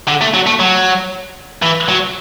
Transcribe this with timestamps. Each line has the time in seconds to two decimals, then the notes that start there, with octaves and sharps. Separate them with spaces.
0.08 D3
0.21 A3
0.34 F#3
0.46 A3
0.60 F#3
1.62 E3
1.88 F#3